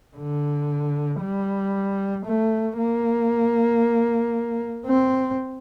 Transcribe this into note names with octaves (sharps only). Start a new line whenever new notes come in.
D3
G3
A3
A#3
C4